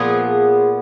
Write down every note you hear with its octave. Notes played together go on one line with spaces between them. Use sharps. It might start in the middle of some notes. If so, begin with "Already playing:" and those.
Already playing: A#2 F3 B3 G#4